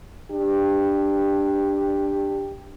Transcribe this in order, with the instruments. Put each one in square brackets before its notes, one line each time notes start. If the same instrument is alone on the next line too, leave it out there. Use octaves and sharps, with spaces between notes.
[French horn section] D4 G4